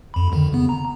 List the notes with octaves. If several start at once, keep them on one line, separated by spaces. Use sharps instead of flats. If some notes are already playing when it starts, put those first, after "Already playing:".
F2 B5
F2 D3 D#3
C#3 B3
A#5